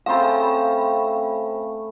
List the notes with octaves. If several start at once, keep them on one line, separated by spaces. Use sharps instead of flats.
A3 C4 C#4 F4 F5 B5